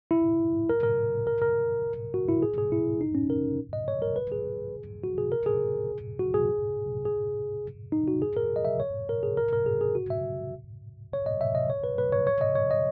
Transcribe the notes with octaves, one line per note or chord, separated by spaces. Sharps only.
E4
A#4
A#4
A#4
A#4
F#4
E4
G#4
G#4
E4
D#4
C#4
A#4
D#5
C#5
A#4
B4
G#4
F#4
G#4
A#4
G#4
F#4
G#4
G#4
D#4
F#4
G#4
A#4
D#5
E5
C#5
A#4
G#4
A#4
A#4
G#4
G#4
F#4
E5
C#5
D#5
E5
D#5
C#5
B4
B4
C#5
C#5
D#5
C#5
D#5